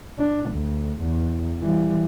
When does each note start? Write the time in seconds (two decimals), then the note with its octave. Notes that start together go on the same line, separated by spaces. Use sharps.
0.18 D4
0.50 D2
1.01 E2
1.61 E3 G3